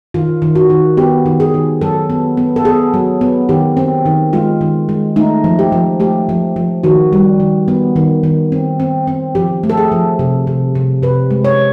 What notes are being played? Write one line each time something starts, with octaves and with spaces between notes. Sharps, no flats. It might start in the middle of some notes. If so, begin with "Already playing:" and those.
D#3 F4
D#3
F#4
D#3
B3 G4
D#3
G#4
D#3
F#3 A4
B3
B3
A4
B3 G#4
F#3
B3
D#3 G4
C4
D#3
G#3 F4
D#3
G#3
A3 D#4
F3
G4
F3
A3 G4
F3
F3
D#3 F#4
G3
D#3
B3
D#3
D#3
C4
C4
C4
F3 G4
A3
A4
G#4
F3
C3
C3
C3
C3 B4
G#3
C#5